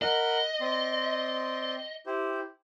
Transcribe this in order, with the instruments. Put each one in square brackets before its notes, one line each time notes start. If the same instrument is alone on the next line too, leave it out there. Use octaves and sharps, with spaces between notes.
[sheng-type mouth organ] A#4 F#5 B5 [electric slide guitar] D#5
[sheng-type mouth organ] C4 D5 C6
E4 G4 C5